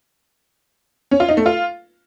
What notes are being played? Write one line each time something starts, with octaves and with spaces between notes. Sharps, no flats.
C#4
F4
D#4
A3
F4